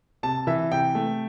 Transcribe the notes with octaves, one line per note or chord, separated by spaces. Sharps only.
C3 A5
E3 E5
C3 G5
A3